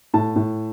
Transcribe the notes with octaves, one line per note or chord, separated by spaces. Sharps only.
A2 A5
A2